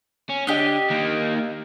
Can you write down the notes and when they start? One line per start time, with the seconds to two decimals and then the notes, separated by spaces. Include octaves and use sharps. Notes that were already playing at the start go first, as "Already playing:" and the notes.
0.29 C#4
0.47 D3 G4 D#5
0.90 D#3 A#3